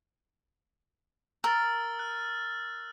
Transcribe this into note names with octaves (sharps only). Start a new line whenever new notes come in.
A#4 E6 F6 A6
F#6